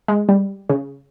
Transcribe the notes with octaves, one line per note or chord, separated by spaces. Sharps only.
G#3
G3
C#3